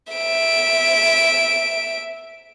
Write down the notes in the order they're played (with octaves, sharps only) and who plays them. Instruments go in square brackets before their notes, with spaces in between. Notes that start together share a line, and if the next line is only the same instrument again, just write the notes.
[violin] E5 D7